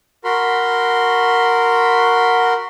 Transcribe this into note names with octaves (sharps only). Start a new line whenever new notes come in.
F#4 A#4 B5 C6